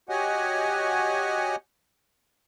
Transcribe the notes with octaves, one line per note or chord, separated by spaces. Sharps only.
F#4 G4 C#5 D#5 F#5 G#5